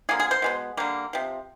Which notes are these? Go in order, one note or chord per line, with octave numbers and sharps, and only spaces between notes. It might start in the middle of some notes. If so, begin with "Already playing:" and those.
D3 F3 A#3 G#4
G#4
C5
B2 G#3 B3
D3 G3 A#3
C3 F3